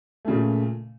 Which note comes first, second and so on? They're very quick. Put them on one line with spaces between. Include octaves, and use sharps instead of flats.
A3 C#3 A#2